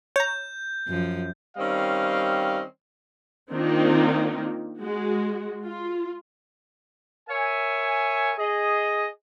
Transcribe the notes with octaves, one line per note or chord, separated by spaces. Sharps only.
C#5 A#5 G6
F#2 F3
D#3 G3 C4 C#4 D#5 F5
D#3 A#3 C4 D4 D#4 F4
G#3 F#4
F4
A#4 C#5 E5 G#5
G#4 D#5